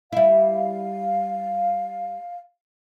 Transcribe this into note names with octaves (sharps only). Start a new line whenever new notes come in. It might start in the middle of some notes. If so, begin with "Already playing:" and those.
G3 E4 F5